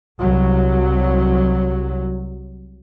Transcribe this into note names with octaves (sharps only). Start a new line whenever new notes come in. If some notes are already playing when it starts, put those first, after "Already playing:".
C2 F#3